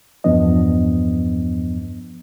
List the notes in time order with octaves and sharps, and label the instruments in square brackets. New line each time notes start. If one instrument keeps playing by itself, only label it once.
[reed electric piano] E2 G2 F3 B3 D4 D#5